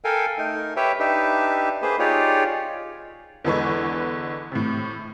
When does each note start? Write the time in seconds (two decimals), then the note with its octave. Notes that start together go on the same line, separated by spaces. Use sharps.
0.04 A4 A#4 F5 G5 G#5
0.38 A3 D#4 A#4
0.76 G4 B4 C#5 E5 G5
1.00 D4 D#4 G4 B4 E5
1.82 A#3 G#4 B4 C5
1.99 D#4 F4 G4 G#4 C#5 D5
3.44 E2 D3 E3 G#3 B4 C#6
4.52 A2 C3